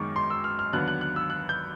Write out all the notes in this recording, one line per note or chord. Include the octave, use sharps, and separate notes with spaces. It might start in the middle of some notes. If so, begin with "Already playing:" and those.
Already playing: F#2 D#3 G#3 B3 D#4 C#6 D6
C6
E6
F6
F6
D#2 D3 F#3 B3 F#6
F#6
F#6
E6
F#6
G6